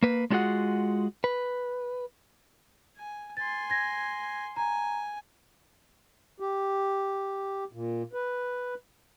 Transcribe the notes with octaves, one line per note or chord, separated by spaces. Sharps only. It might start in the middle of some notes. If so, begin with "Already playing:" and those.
A#3 B4
G#3 D4 F4 F#4 G#4 F#5
B4
G#5
G#5 C6 A6
G#6 A#6
G#5 A#5
G4
A#2
B4